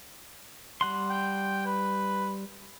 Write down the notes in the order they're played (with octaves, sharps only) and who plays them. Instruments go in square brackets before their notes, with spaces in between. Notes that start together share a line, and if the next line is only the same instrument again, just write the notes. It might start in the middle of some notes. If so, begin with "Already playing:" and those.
[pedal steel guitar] G3 F#5 C6
[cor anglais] G5
B4